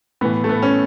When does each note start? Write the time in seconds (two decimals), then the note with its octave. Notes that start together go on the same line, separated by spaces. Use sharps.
0.21 A2 E3 B3
0.44 A3
0.49 B3
0.62 C#4